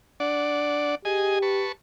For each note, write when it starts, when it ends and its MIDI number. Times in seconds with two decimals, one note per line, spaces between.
0.20 0.95 62
0.20 0.95 74
0.20 0.95 78
1.05 1.69 67
1.05 1.39 68
1.05 1.39 75
1.05 1.39 80
1.42 1.72 71
1.42 1.72 81
1.42 1.72 85